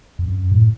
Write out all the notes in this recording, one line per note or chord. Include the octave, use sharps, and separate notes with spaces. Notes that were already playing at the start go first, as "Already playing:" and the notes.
F2
F#2
A2